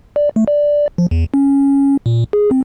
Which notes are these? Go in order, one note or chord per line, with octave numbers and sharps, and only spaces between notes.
D5
A3
D5
F3
E2
C#4
A#2
G#4
C4